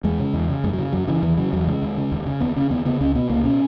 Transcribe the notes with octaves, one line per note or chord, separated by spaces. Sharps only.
E2 G#3
C#3
E2
C#3
F#2 G#3
F#3
C#3
F#2 F#3
C#3 E3
E2 E3
C#3 F#3
E2 F#3
C#3 G#3
D#2
C#3
D#2
C#3
D#2 B3
C#3 C#4
D#2 B3
C#3 B3
C#2 C#4
B2 B3
C#2 A#3
B2 C#4